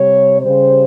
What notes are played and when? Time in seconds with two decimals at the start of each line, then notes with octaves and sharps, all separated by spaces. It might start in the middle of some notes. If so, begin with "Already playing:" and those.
Already playing: C3 G3 C#5
0.42 C#3 G3 C5